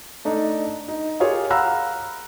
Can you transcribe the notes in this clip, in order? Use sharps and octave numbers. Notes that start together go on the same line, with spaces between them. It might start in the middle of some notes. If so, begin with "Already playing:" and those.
A3 D4 D#4
D#4
F4 G4 G#4 A#4 C#5
F5 F#5 A#5 B5 E6 F#6